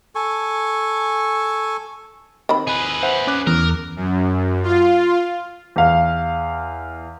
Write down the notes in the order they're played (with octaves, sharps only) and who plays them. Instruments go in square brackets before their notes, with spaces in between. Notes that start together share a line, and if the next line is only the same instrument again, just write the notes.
[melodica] A4 G#5 C#6
[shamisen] D#3 C4 B5
[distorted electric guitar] G#4 B4
[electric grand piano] C5 E5 F#5
C#4 D6 F#6
[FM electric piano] E2 [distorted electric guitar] A#4
[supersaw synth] F#2
F4
[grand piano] E2 F5